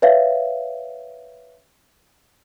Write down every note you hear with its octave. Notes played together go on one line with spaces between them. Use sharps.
B4 C#5 E5 F5